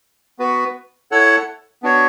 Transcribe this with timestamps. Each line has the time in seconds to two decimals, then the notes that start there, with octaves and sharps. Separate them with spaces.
0.39 B3 F#4 B4
1.11 E4 A4 C#5 F#5
1.83 B3 D4 F#4 C#5